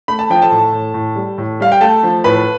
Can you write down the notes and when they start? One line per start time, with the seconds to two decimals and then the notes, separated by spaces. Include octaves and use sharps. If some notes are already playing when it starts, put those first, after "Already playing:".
0.08 A3 B5
0.19 A5
0.30 F3 G5
0.42 A4 A5
0.51 A2
0.72 A2
0.94 A2
1.16 G3
1.38 A2
1.60 G3 F5
1.72 G5
1.81 A3 A4 A5
2.03 F3
2.24 A2 B4 B5